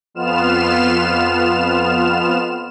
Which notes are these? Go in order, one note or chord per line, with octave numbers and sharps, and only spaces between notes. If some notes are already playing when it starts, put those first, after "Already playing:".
F2 B3 F4 F6 E7